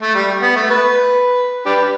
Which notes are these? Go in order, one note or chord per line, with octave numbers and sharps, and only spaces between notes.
A3
G3
B3
A3
B4
D4 G4 B4